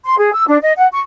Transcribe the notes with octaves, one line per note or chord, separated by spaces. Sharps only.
C6
G#4
E6
D4
D#5
F#5
C#6